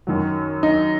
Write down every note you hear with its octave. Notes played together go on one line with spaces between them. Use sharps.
F#2 D#3 F#3
D#4